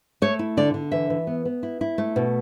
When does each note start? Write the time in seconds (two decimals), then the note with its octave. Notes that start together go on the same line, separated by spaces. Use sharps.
0.22 A3 C#5
0.39 E4
0.57 D3 D5
0.74 D3
0.92 E3 E5
1.10 E3
1.27 B3
1.45 B3
1.63 E4
1.81 E4
1.98 A3
2.16 B2